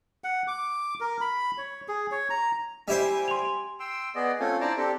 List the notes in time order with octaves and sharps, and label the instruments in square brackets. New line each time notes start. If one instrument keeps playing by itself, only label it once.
[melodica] F#5
D6
A#4
B5
C#5
G#4
C#5
A#5
[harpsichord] G3 E4 C5 [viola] G4 G#5
[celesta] C6 F7
[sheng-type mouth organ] G5 C6 E6
B3 G#4 D5 D#5
A3 C4 C#4 F4 A4 G#5
D4 E4 C5 D5 A5 A#5
C4 D4 G4 A4